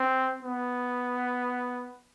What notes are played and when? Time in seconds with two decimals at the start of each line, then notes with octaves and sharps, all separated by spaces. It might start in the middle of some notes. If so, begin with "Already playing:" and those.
Already playing: C4
0.43 B3